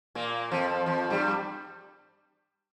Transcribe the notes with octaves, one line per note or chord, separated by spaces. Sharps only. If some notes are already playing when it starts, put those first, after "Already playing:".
A#2 A#3
F2 F3
F2 F3
G2 G3